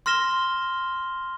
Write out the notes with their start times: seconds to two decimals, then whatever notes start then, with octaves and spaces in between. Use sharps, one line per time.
0.06 C6 F6 A#6 E7 G7